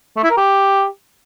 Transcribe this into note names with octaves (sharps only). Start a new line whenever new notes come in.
A3
E4
A#4
G4